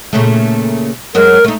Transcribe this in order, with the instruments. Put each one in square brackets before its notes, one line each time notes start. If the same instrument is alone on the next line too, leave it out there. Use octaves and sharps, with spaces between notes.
[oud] A#2 C#3 A3
[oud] F#2 F#3 G#3 [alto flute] A#4
[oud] A3 D#4